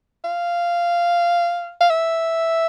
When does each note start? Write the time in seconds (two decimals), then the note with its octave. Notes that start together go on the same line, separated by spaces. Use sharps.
0.25 F5
1.81 F5
1.90 E5